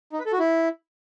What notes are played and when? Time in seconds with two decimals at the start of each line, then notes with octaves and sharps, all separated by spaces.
0.12 D#4
0.19 B4
0.26 A4
0.32 F#4
0.39 E4